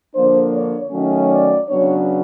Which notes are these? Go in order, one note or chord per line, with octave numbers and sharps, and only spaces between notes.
D3 F3 A#3 D4 C5
C#5
D#3 F#3 A3 C#4
D5
C#3 F#3 B3 D4 C#5